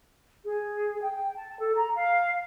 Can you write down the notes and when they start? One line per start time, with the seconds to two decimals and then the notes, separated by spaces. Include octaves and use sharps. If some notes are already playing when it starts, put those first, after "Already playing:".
0.46 G#4
1.02 G5
1.36 A5
1.60 A4
1.75 A#5
1.96 F5